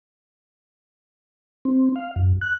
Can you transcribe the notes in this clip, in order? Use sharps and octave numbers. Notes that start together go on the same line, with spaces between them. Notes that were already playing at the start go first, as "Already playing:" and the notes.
C4
F5
F#2
F#6